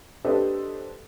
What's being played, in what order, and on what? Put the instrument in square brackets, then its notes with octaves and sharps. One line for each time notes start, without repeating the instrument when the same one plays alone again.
[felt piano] D4 G4 A4 B4 C5 D#5